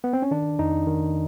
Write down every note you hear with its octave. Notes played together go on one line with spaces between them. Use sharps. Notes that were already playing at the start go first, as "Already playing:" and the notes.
B3
C4
C#4
D#3 D4
F2 D#4
D#3